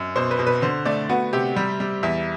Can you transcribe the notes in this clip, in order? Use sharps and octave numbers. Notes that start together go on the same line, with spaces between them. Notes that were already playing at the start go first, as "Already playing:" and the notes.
Already playing: F#2
B2 C5
B4
B2
B4
D3 C5
A3 D5
B3 F#4
C3 G4
G3
G3
E2 E5